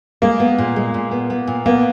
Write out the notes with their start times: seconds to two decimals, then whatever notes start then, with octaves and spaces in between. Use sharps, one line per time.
0.22 G#3 A#3
0.40 B3
0.58 A#2
0.76 G#3
0.94 A#2
1.11 B3
1.30 B3
1.47 A#2
1.66 A#3 B3